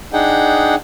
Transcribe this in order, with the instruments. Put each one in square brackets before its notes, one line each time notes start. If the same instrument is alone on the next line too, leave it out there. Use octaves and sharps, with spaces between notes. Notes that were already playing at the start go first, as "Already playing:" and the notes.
[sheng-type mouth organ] D4 D#4 G#4 F#5 G5